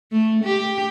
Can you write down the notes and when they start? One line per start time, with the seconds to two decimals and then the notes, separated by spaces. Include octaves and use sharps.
0.12 A3
0.44 G4